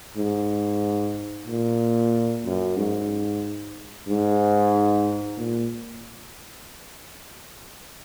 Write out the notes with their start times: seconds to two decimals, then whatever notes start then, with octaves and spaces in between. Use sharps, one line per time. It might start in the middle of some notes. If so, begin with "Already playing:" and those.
0.16 G#2
1.46 A#2
2.45 F#2
2.77 G#2
4.08 G#2
5.37 A#2